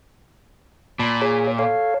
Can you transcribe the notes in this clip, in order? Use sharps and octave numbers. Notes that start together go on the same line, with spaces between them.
A#2 A5 B5
G#4 C#5
A4 C#5 F5